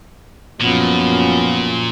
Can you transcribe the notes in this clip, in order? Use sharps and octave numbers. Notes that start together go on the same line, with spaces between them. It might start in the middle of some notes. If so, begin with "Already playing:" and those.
F#2 A#2 F3 B3